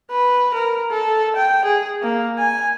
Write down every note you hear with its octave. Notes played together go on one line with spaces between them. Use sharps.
B4
A#4
A4
G5
G#4
A#3
G#5